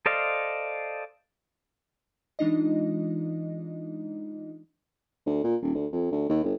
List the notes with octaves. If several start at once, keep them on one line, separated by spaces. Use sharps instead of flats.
A4 C5 D5 D#5 F5
E3 G#3 D4 D#4 F4 D#5
D2
A#2
D#1
D2
F2
D2
D#2
G1